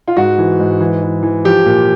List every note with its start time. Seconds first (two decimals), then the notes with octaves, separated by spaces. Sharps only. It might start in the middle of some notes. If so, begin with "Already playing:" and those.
0.08 F4
0.16 G#2 F#4
0.38 E3
0.59 G#2
0.80 E3
1.02 E3
1.23 E3
1.45 F3 G4
1.65 A#2